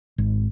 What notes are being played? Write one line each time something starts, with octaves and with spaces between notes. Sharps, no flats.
G#1